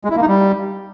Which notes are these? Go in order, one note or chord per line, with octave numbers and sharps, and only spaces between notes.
G#3
E4
A#3
D#4
G3